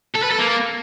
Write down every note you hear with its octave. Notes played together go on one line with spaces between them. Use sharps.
A4
B4
A4
A#3